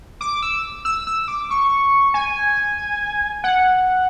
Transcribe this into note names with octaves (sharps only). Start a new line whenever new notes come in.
D6
E6
E6
E6
D6
C#6
G#5
F#5